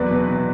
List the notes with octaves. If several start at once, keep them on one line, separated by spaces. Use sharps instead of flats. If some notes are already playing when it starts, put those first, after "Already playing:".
Already playing: E2 F#3 B4 D5
B2
B2